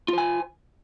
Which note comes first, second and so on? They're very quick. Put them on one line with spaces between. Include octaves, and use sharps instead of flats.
F4 C5 G#5